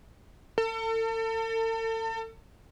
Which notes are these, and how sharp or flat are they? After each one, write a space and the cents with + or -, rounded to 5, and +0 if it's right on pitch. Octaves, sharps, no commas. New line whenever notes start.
A4 +40